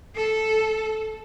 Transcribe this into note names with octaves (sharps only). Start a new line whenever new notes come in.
A4